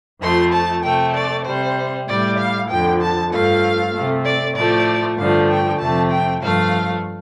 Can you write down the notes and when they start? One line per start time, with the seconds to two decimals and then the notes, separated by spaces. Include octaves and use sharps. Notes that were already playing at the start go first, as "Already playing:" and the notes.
0.21 F2 F3 A3 C6
0.52 A5
0.83 C3 A3 G5
1.14 D5
1.45 C3 G3 C5
2.08 A2 G3 D5
2.38 F5
2.69 F2 D3 F3 G5
3.01 A5
3.32 G2 F3 A3 F5
3.93 C3 A3
4.25 D5
4.55 A2 F3 A3 D5
5.18 G2 D3 F3 A3 F5
5.49 G5
5.79 F2 C3 F3 A3 A5
6.11 G5
6.41 G2 F3 A3 F5